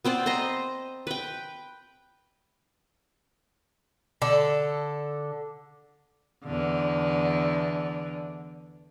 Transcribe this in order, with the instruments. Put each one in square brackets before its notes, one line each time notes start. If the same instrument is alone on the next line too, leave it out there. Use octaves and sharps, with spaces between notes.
[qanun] B3 C4 C5 D5
C5 D#5 A#5 C6
B4 G5
[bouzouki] D3 A4
[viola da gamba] E2 D3